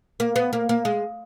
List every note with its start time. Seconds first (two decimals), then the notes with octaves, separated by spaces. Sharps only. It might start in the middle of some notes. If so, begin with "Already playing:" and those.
0.20 A#3
0.36 B3
0.53 A#3
0.69 A#3
0.85 G#3